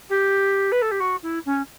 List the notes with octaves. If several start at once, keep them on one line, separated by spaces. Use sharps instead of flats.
G4
B4
A4
G4
F#4
E4
C#4